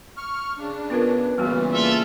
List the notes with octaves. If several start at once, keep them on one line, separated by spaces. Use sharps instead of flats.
C#6 F6
C#3 D4
B3 F4 A#4 B4
A#2 C#3 E3 G3 B3 F#4
A#3 F4 A4 E5